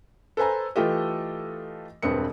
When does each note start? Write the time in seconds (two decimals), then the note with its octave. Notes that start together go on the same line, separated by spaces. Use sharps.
0.37 A4 B4 C5 G#5 A#5
0.76 E3 A3 F4 G4 A4 D#5
2.02 E1 G2 C4 B4 D#6 C#7